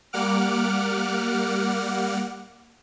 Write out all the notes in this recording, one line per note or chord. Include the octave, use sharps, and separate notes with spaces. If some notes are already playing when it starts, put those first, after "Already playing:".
G3 A#3 F#5 D6 F6